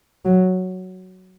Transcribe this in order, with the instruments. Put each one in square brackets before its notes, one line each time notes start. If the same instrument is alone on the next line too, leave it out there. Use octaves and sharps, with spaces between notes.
[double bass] F#3